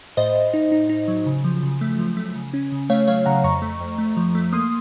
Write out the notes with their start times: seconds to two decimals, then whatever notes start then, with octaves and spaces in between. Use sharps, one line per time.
0.17 A2 C5 D#5
0.35 A2
0.54 D#4
0.72 D#4
0.89 D#4
1.08 F#3
1.26 C#3
1.44 F3
1.63 C#3
1.81 A3
1.98 F3
2.17 A3
2.35 C#3
2.54 C#4
2.72 C#3
2.90 A3 C#5 F5
3.08 F#3 C#5 F5
3.26 C#3 F#5 A#5
3.44 F2 A#5 C#6
3.62 A3
3.80 F2
3.98 A3
4.17 F3
4.35 A3
4.52 A#3 C6 D#6